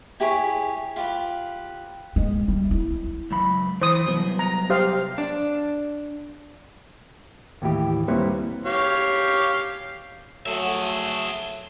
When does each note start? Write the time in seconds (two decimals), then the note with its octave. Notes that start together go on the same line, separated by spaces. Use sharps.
0.20 E4 G4 G#4 C#5
0.96 F4 G4 B4
2.16 G#3
2.48 G3
2.71 E4
3.31 C#2 F#2 B5
3.82 E3 C5 D#6
4.07 C2 F#3 B3
4.39 A#5
4.70 G4 C5 F5
5.18 D4
7.62 D#2 A2 E3 G4
8.08 G3 A#3 C4 E4 B4 C#5
8.66 G4 C#5 F5
10.46 F#3 A3 G#4 E5